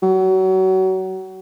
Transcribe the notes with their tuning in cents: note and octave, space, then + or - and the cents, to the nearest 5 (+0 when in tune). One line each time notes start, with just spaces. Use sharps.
F#3 +30